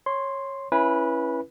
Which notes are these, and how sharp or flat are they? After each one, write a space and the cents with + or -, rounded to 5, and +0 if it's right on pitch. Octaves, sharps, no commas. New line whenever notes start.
C#5 -15 C6 +0
C#4 -10 E4 +10 B4 -20